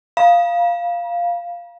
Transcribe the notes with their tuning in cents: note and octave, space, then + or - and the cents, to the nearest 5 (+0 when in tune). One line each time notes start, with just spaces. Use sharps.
F5 -5 A#5 +45